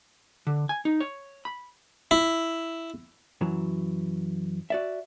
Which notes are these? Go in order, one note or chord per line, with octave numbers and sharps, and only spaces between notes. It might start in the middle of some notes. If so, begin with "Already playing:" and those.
D3
G#5
D#4
C#5
B5
E4
F#2 E3 F#3
F#4 D5 E5